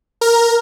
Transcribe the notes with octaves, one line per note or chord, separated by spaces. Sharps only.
A#4